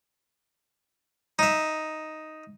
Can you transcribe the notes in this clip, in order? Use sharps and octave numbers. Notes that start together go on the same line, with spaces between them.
D#4 E5